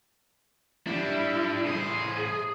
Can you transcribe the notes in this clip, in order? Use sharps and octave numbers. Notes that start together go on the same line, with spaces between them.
G3 D4 E4
A2 G#4 C5